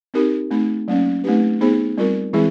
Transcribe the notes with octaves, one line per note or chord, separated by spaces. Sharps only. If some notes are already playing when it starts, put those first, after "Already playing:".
C4 D#4 G4 A#4
A3 C4 D#4
F#3 A#3 C#4
A3 C4 D#4 G4 B4
B3 D#4 G#4 C5
G3 C4 F4 A#4
E3 G#3 C4 E4 G#4